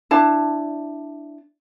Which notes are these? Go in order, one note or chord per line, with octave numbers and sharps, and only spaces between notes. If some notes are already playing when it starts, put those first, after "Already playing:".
D4 E4 D5 A5